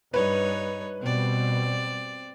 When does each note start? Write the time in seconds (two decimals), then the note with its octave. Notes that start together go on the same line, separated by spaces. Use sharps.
0.14 G2 D#4 B4 C#5
1.02 B2 G3 C4 D5